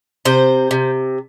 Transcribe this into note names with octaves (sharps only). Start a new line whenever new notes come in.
C3 C5
C3